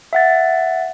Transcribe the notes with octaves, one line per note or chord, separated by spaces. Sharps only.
E5 F#5 A6